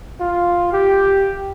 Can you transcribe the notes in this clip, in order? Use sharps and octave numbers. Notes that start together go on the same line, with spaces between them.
F4
G4